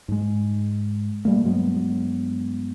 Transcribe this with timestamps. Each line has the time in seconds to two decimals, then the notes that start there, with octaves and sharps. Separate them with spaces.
0.08 G#2 G#3
1.25 B2 G3 A3 A#3
1.44 G2 F#3 G#3 B3